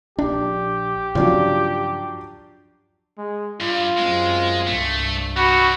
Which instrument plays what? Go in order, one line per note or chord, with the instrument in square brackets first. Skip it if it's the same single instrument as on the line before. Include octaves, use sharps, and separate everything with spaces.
[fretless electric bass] A#1 D4 [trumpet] G4
[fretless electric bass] G2 C#3 F3 [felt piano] F#3 D4 F4
[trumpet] G#3
[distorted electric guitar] G2 [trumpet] F4
[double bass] F#2 C4 [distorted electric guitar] G#3
[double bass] C2 G2 [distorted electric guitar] A3
[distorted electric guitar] F#3 G3 [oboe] F#4 [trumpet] B5